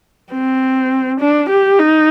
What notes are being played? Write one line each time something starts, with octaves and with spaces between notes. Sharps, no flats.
C4
D4
G4
D#4